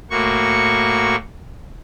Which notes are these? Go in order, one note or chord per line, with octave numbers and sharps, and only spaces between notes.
A2 A#3 F#4 C#6